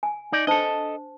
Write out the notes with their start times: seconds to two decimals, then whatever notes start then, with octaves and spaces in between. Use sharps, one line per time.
0.03 G#5
0.32 D#4 D5
0.47 D4 A4 C5 D#5 A5